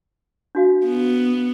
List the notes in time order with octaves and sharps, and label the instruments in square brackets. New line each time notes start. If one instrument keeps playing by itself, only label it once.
[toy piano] D4 F#4 F5
[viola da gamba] B3